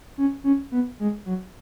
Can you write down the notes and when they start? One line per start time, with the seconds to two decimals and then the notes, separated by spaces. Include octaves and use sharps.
0.18 C#4
0.44 C#4
0.72 B3
1.00 G#3
1.26 F#3